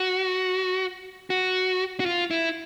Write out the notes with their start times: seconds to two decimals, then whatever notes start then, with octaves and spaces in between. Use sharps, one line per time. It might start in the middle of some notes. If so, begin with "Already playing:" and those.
Already playing: F#4
1.30 F#4
2.00 F#4
2.06 F4
2.31 E4